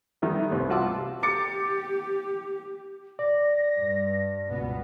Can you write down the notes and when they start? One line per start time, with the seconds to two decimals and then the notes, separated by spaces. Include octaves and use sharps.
0.22 D#3 G3 A3 B3
0.51 C2 B3
0.69 G3 F4 F#4 A5 D6 E6
1.23 G4 D6 A6 C#7
3.19 D5 A#6
3.75 G2
4.47 C#2 B2 B3